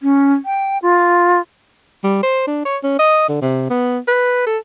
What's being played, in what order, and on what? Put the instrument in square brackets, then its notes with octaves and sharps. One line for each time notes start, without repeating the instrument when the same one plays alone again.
[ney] C#4
G5
F4
[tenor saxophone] G3
C5
D4
C#5
C#4
D#5
D3
C3
B3
B4
A4